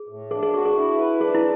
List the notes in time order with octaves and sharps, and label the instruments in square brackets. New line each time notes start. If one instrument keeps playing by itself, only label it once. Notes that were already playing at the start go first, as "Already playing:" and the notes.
Already playing: [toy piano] G#4
[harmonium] A2
[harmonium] D4 [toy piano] G#4
[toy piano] G#4
[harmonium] F#4 [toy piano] G#4
[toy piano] G#4
[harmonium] E4
B4
[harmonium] D4 [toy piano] G#4
[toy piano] E4